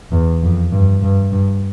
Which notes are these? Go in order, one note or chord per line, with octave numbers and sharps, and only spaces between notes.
E2
F2
G2
G2
G2